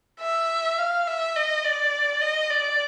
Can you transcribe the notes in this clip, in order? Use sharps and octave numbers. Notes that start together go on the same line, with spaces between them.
E5
F5
E5
D#5
D5
D#5
D5